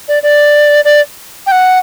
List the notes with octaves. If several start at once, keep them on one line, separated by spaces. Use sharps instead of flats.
D5
D5
D5
G5
F#5